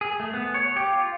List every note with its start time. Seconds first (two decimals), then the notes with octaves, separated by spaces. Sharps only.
0.01 G#4
0.20 A3
0.34 B3
0.54 C#5
0.76 G4
0.90 F4